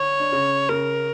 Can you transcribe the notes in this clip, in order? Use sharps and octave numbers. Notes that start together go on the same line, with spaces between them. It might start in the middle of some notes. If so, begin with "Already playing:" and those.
Already playing: D3 C#5
D4
C#3 C#4
C#3 C#4 A#4